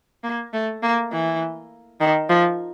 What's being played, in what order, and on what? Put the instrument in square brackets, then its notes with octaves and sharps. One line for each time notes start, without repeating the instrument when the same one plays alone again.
[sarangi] A#3
A3
A#3
E3
D#3
F3